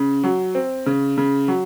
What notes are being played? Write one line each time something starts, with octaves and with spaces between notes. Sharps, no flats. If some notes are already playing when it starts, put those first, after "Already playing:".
Already playing: C#3
F#3
C4
C#3
C#3
F#3